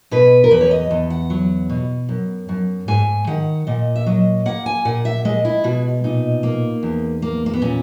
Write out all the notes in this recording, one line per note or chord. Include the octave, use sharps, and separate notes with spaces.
B2 B4
A#4
E2 B4
C#5
D#5
E2
F#5
F#3
B2
F#2
F#2
G#2 G#5
D#3 F#5
A#2 D#5
E5
F#3 D#5
A#3 F#5
G#5
A#2 F#5
E5
G#3 D#5
E4
B2 F#4
A#2 D#4
A#3
E2
A#3
A#3
B3
A#2 C#4